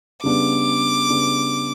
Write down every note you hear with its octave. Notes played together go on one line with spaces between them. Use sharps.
C#3 G3 B3 D4 D6
C#3 G3 B3 D4